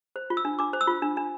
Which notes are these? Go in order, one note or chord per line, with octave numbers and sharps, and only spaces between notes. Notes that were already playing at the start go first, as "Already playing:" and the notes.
C5
F4
E6
D4
D4 D6
C5
E6
F4
D4
D4